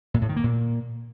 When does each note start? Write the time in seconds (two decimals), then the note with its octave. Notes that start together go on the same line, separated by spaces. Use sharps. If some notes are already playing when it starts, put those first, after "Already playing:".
0.14 A#2
0.22 A2
0.29 D#3
0.36 A#3
0.44 A#2